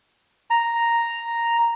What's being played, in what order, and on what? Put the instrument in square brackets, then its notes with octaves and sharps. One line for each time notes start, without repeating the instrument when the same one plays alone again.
[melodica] A#5